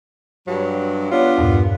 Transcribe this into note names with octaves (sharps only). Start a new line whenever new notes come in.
G2 F#3
B3 D4 F4 C#5
E2 G2 A#2